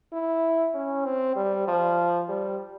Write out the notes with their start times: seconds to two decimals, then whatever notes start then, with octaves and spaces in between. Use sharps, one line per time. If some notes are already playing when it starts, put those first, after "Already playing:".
0.12 E4
0.75 C#4
1.05 C4
1.36 G3
1.67 F3
2.28 G3